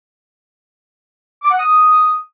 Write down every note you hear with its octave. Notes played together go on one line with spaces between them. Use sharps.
D6
F#5
D#6